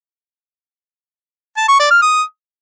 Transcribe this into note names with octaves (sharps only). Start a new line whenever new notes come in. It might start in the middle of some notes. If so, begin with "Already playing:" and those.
A5
C#6
D5
F6
D#6